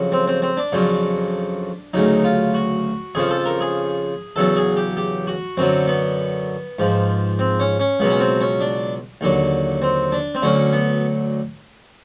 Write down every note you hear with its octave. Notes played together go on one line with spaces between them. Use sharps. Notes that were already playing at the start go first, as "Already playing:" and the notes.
Already playing: F2 C#3 F#3
C4
C4
C4
D4
F2 C#3 F#3
D2 C#3 F#3 D#4
F4
F#4
F2 C#3 F3 G#4
A4
A#4
G#4
E2 C#3 F#3 A4
G#4
G4
G4
F#4
F#2 D3 F#3 C4
B3
G#2 F3
C4
C#4
C#4
C#2 B2 F#3 B3
C#4
C4
C#4
D4
D#2 D3 F#3
C4
D4
C4
D2 D3 F#3 C#4
B3